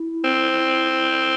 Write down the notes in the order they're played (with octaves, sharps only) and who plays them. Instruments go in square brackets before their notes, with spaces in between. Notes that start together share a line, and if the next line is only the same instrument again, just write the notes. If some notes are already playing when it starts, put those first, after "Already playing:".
Already playing: [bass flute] E4
[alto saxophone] C4